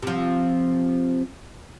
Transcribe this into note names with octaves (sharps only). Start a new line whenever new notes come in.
C3 F3